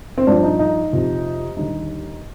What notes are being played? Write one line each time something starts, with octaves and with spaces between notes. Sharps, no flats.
C4
G2 F3 D4
D#4
D#4
F2 C3 F3
D#2 D3 G3 D#4